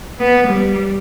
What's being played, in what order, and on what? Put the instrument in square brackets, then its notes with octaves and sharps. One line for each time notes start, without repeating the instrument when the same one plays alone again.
[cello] B3
G3